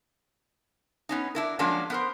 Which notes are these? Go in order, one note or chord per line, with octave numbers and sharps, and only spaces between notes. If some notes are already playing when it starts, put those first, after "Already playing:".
B3 C#4 D#4
D4 E4 A#4
F3 F#3 G#3 A#3 C#4 D4
B3 A#4 C5